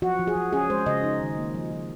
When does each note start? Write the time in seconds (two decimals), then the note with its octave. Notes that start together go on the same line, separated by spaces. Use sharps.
0.02 F3 F#4
0.19 F3
0.27 G#4
0.35 F3
0.53 C#4 G#4
0.70 G#3 C5
0.86 C#3 D#5
1.04 D#4
1.21 D#3
1.37 A#3
1.55 F3
1.71 F3